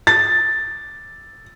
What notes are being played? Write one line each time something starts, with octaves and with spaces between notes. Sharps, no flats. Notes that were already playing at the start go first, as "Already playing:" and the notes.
A6